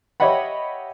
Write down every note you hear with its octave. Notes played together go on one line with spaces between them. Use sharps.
G4 C#5 D#5 E5 F#5 B5